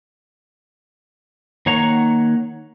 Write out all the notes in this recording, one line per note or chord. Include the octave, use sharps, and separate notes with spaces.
D#3 A#3 C#5 F#5 A#5